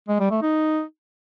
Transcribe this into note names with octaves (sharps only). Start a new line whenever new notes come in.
G#3
G3
A3
D#4